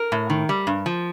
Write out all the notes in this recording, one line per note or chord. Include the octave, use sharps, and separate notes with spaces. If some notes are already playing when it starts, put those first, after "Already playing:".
Already playing: A#4
A2
D#3
G3
G2
F3